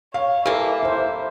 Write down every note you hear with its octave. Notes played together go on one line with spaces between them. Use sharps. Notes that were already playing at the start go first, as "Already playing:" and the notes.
C#5 F5
E3 A#3 G4 A4 E5
E4 C5